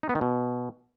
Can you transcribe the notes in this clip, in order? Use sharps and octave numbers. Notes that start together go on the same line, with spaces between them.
D#4
B3
D#3
B2